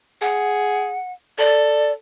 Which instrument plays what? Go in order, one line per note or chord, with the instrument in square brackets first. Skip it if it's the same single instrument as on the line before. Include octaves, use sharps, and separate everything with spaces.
[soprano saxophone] G#4 [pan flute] F#5
[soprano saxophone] A4 [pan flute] D5